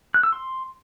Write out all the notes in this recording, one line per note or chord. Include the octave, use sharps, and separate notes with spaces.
F#6
E6
C6